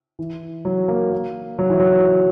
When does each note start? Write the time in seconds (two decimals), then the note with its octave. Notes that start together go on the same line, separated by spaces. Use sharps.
0.19 E3
0.65 F#3
0.88 A#3
1.12 A#3
1.59 F#3
1.70 E3
1.80 F#3